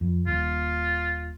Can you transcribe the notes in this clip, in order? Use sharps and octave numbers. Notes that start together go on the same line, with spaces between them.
F2
D#1 F4